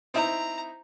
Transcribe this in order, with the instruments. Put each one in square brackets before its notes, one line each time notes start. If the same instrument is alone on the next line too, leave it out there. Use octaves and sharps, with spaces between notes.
[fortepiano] C4 D#4 E4 [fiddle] A#5